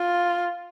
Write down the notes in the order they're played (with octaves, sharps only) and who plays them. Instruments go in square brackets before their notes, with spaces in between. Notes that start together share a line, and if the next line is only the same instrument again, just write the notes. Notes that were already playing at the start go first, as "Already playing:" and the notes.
Already playing: [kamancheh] F4